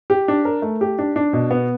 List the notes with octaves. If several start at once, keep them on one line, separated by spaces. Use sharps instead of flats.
G4
D4
A#4
A3
G4
D4
D4
B2
B3